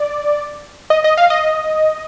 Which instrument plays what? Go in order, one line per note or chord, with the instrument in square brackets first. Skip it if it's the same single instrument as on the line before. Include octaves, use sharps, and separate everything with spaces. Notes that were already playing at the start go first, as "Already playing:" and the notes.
Already playing: [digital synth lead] D5
D#5
D#5
F5
D#5